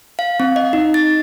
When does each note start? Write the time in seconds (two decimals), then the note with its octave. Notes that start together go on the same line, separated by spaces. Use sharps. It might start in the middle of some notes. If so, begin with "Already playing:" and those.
0.19 F5
0.40 C4
0.56 D#5
0.73 D#4
0.94 A6